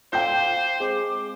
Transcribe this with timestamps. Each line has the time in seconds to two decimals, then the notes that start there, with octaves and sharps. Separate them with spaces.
0.13 F4 A4 C5 F5 G5 D6 G6
0.80 G#3 C4 G#4 D6